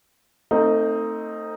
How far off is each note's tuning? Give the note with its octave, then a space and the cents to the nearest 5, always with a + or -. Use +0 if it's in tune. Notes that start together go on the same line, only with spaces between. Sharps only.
A3 +40 C4 +10 D#4 +0